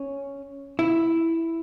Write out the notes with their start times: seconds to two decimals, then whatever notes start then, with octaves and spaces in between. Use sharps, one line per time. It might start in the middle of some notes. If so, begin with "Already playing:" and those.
Already playing: C#4
0.79 E4